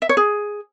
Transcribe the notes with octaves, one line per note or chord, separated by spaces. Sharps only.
E5
C#5
G#4